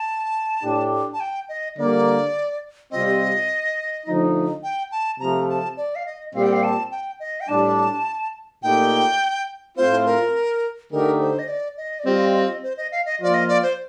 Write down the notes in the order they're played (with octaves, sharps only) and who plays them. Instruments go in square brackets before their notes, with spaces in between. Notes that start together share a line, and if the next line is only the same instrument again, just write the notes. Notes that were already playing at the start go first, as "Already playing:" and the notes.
Already playing: [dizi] A5
[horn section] A2 A3 D4 G4
[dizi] A5
G5
D#5
[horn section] D3 G3 A#3 [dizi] D5
[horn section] C3 G3 C4 F4 [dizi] D#5
[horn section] D3 F3 A3 D#4
[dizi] G5
A5
[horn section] C3 F3 A3 [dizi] A#5
[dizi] A5
D5
F5
D#5
[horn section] A#2 G3 C4 G4 [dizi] F5
[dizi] G5
F5
A5
G5
D#5
G5
[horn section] A2 G3 D4 [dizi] A5
[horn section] A#2 A3 D#4 G4 [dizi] G5
[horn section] A2 A3 C4 F4 [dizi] C5
[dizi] A#4
[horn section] D3 A3 D#4 G4 [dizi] A#4
[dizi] C5
D#5
D5
D#5
D5
[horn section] G3 C4 F4 [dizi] D#5
[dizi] D#5
C5
D#5
F5
D#5
[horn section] F3 A#3 F4 [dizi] D5
[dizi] D#5
D5
C5